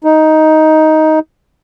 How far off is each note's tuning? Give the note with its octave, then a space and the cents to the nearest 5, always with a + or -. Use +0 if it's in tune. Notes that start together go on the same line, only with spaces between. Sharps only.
D#4 +10